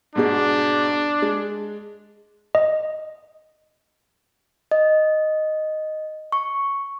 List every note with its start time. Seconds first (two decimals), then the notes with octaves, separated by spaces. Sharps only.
0.16 G#2 B2 G#3 D4
1.22 G#3
2.55 D#5
4.71 D#5
6.32 C#6